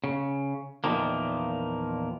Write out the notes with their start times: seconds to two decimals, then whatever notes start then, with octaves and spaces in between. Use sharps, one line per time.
0.04 C#3
0.84 E2 A#2 D#3 F3 A#3